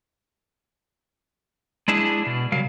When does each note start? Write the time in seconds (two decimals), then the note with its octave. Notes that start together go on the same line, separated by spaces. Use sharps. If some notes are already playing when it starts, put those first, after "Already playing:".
1.88 G#3 D4 E4 G#4
2.26 B2
2.52 C#3 F#3 G3 A#4 F5